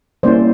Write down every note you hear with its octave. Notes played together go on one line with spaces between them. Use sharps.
G3 A#3 C#4 E4 C5 D5